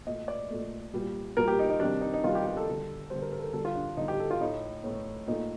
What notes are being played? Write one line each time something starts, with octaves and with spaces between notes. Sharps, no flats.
A#2 A3 D#5
D5
A#2 A3
A#2 G3
A#2 G3 A#4
G4
D#4
D#4
C3 D#3 G3 D4
D#4
D#4
C3 D#3 G3 F4
G4
G4
A4
D3 G3
D3 G3 C5
A#4
A#4
A4
A#4
D3 G3 A4
F4
D4
D3 G3 D#4
G4
A4
F4
A2 A3 D#4
A2 A3
A#2 A3 D#4